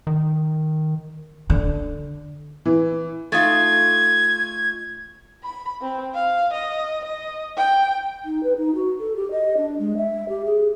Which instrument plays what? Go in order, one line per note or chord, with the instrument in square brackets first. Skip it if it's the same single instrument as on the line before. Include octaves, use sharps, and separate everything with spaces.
[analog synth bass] D#3
[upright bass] D3
[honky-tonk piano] E3
[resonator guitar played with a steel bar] A3 D#4 F4 [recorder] G#6
[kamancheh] B5
C4
F5
D#5
D#5
G5
[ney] D#4
B4
D#4
F#4
A4
G4
D#5
D4
G#3
E5
G4
G#4